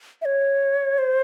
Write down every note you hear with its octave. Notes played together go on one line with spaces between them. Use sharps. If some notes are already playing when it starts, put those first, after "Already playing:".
E5
C#5
C5